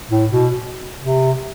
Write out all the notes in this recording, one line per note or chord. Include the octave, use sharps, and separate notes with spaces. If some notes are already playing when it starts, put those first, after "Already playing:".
A2
B2
C3